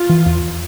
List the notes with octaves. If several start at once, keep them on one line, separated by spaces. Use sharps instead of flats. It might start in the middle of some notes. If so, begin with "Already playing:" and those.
Already playing: F4
E3
E2